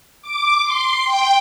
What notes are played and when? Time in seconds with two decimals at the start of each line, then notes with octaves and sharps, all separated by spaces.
0.22 D6
0.64 C6
1.05 G5